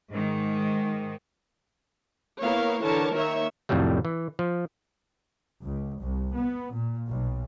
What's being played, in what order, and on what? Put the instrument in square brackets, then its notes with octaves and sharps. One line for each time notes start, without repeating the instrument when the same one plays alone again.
[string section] G#2 D#3
[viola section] A#3 B3 E4 A#4 C#5 F5
D3 E3 A#4 C#5 A5
D#3 A#3 C#5 E5
[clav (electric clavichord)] C2 F2 A2 F#3 G3 A3
E3
F3
[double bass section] C#2
C2
B3
A#2
B1